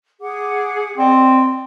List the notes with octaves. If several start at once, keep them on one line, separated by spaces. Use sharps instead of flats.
G#4 F#5 D6
C4 D5 D#5